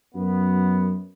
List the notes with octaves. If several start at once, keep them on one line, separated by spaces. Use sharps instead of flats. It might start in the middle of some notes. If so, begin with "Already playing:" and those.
F#2 B3